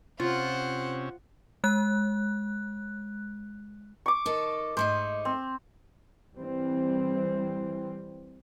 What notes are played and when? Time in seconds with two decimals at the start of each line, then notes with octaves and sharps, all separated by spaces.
0.20 C3 C#4 F4 C5 F#5
1.64 G#3 F#6
4.06 C#6 D6
4.26 D#3 A4
4.77 G#2 A3 D#4 C5
5.25 C4
6.35 E3 G3 C4